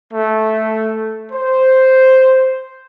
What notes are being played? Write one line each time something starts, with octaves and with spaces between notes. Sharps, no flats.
A3
C5